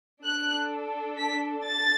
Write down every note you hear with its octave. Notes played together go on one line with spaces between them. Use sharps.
D4 A4 F#6
B6
A6